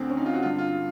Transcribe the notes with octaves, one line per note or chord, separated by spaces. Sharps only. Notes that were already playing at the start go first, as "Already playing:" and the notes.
Already playing: D2 D3 C4
C#4
D#4
F4
F#4
G2 D3 F4
F4